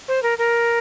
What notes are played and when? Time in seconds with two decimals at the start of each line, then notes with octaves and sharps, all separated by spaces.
0.08 C5
0.23 A#4
0.38 A#4